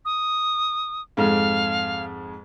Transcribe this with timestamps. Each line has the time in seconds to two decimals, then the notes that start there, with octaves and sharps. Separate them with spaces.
0.05 D#6
1.17 F2 G#2 F5